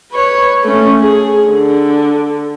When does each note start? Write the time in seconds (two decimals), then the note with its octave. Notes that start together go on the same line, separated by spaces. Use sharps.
0.12 B4 C#5
0.64 A3 C#4
1.00 G#4
1.47 D3